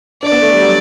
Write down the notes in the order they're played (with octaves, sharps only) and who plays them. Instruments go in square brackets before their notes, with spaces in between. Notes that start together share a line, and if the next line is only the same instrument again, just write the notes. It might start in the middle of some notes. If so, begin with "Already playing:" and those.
[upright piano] D4 [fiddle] D5
[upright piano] B3
A3
G3
F#3